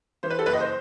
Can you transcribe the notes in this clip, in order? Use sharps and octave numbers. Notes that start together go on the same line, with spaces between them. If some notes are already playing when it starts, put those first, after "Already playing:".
E3 C5
B4
A4
F#1 B4
D#5
C5